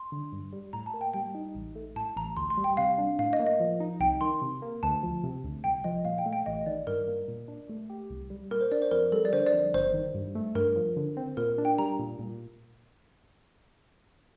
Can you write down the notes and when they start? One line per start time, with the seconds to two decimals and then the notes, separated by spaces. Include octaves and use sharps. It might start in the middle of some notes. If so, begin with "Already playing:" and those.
Already playing: C6
0.12 D3
0.32 G2
0.53 G3
0.73 A2 A#5
0.86 A5
0.94 A#3
1.01 G5
1.14 G3 G5
1.35 D#4
1.55 A1
1.76 A3
1.96 A2 A5
2.16 A1 A#5
2.37 D2 C6
2.50 C6
2.57 G3
2.64 G5
2.77 C3 F5
2.98 D4
3.19 A2 F5
3.33 D#5
3.39 A#3
3.47 D#5
3.60 F3
3.80 D#4
4.00 C2 G5
4.21 D#3 C6
4.42 C3
4.62 A#3
4.83 D2 A5
5.03 F3
5.23 C3
5.44 D2
5.64 C2 G5
5.84 F3 D#5
6.05 A#2 F5
6.18 G5
6.26 A3
6.33 G5
6.46 A1 D#5
6.66 D#3 D5
6.87 G2 A#4
7.08 A#3
7.28 A#2
7.48 D4
7.69 A3
7.90 G4
8.10 C2
8.30 G3
8.51 A#2 A#4
8.61 C5
8.71 D4 D5
8.82 C5
8.91 F2 A#4
9.12 G3 A4
9.25 D5
9.33 D3 C5
9.46 D5
9.53 F2
9.74 G1 C5
9.94 D#3
10.14 G2
10.35 A3
10.55 G2 A#4
10.76 F3
10.96 D3
11.17 C4
11.37 A#2 A#4
11.58 D4
11.65 G5
11.78 G3 A#5
11.99 A#2
12.19 A#2